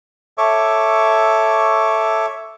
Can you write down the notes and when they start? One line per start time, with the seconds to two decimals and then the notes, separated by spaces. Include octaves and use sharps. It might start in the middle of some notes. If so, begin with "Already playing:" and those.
0.38 A4 C#5 E5 C#6 D6